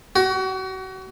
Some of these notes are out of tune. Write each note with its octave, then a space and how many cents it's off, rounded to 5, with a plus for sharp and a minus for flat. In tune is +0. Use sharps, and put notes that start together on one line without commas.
F#4 +35